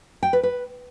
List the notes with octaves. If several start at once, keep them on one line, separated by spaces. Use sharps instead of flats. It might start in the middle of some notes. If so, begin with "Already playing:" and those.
G5
B4
B4